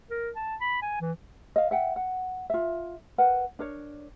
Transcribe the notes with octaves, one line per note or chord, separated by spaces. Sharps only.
A#4
A5
B5
G#5
E3
D#5 F5
E5 F#5 G5
F#5
F4 E5
A#4 B4 F#5
D4 A#4 C#5